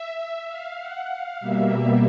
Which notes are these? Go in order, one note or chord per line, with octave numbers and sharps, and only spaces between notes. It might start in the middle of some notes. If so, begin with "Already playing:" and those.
Already playing: E5
F5
F#5
F5
B2 G3 A#3 E5